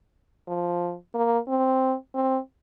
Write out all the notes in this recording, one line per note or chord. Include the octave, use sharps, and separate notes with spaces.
F3
A#3
C4
C4